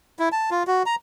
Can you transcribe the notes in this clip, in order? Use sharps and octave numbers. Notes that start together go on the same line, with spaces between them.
E4
A5
F4
F#4
A#5